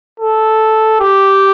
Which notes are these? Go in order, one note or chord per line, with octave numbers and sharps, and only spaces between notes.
A4
G4